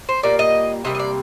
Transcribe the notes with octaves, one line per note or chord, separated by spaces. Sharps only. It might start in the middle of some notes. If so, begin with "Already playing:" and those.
C5
A#2 G3 A#3 D5
D#5
C3 G3 A#3 D#5
D#5
D5